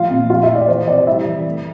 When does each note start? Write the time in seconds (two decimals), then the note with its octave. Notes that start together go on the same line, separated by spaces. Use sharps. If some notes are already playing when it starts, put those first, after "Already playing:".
Already playing: A2 F3 F4 F5
0.11 A#2
0.30 F3 F4 F5
0.43 E4 E5
0.49 A2
0.56 D5
0.68 E3 C5
0.88 C3 D5
1.06 G3 E4 E5
1.26 E3
1.45 A3